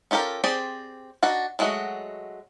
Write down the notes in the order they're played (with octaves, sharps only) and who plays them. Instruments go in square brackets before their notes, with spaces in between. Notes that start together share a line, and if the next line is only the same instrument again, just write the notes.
[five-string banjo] C#4 F4 G4 A4 A#4
C4 G4 G#4 C5 D5
D4 D#4 F#4 F#5
F#3 G#3 A3 F#4 D#5